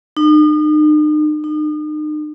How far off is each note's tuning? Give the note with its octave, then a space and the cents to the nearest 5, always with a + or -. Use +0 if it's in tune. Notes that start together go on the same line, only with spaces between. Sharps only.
D#4 -40
D#4 -40